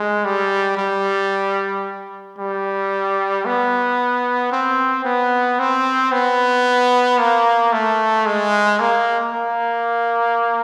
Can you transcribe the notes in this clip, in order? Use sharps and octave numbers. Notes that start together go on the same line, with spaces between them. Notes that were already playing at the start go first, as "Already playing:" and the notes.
Already playing: G#3
G3
G3
G3
B3
C4
B3
C4
B3
A#3
A3
G#3
A#3
A#3